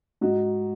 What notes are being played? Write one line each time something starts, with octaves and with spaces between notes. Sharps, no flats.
G#2 D#4 F#4